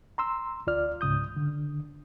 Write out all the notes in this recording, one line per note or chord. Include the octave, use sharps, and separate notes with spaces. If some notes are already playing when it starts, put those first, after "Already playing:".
A#5 C6 E6
D2 F4 D5 F6
C#2 G#2 C#3 D#6 G6
D3